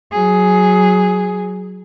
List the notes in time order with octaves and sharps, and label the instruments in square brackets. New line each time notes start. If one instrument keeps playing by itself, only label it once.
[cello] F#3 G#4